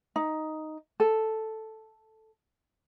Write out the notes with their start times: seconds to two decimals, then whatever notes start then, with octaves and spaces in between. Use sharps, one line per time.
0.16 D#4
1.00 A4